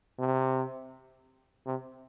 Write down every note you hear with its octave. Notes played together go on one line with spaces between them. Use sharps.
C3
C3